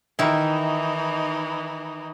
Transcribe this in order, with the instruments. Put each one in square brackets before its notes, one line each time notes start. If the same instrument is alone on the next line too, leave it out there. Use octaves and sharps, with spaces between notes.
[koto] D#3 E4 [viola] E3 D#4